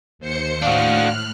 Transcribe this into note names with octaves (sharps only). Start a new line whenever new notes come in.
D#2 C5 C#7
A2 D4 F#4 F5 F6 F#6